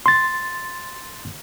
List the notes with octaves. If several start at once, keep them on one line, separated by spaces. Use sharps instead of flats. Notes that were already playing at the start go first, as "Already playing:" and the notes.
C6 A6